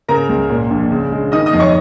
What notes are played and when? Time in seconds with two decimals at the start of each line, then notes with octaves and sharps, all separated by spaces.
0.08 C#3 A#4 A#5
0.29 C#2
0.49 A#2
0.70 A#1
0.91 C#3
1.12 G#3
1.32 D#3 D#5 D#6
1.46 D#5 D#6
1.53 F2
1.60 C#5 C#6